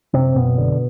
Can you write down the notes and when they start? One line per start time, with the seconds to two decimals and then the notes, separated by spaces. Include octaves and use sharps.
0.14 F#1 C3 C4
0.36 F#1 B2 B3
0.58 D3